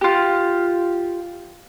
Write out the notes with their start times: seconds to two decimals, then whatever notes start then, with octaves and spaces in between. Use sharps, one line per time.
0.01 F4 G4